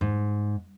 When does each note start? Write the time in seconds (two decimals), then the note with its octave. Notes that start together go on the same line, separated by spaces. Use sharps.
0.01 G#2